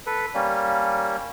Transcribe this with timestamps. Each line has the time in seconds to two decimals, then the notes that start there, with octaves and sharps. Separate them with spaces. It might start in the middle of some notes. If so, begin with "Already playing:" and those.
0.06 A4 B4
0.34 G3 A#3 C#4